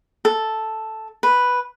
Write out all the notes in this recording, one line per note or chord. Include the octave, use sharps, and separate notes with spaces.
A4
B4